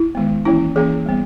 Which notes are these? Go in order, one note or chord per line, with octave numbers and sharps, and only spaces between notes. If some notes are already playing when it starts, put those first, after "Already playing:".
Already playing: E4
D#3 G#3 B3
E3 A#3 C#4 E4
E3 A#3 C#4 G#4
G3 B3